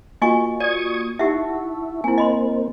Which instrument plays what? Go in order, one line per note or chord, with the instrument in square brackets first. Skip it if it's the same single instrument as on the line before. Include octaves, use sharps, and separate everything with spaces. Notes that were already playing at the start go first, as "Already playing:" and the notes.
[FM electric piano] A#3 F4 F#4 [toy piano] D#5 G#5 C#6
[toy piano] D5 [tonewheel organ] C#6 D#6 G#6
[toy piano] D#4 G4 E5 [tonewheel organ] E4 [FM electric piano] F#5 A5 C#6
[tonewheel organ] A#3 C4 [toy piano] E4 G#5
[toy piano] D#5 B5 C6